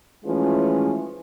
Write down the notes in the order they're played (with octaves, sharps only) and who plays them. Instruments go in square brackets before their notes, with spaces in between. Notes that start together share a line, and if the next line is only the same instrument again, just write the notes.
[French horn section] E3 F3 G#3 A3 C#4 F4